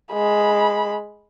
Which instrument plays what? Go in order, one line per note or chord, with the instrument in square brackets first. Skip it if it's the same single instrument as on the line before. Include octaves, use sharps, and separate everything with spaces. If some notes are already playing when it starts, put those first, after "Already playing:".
[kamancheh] G#3 B5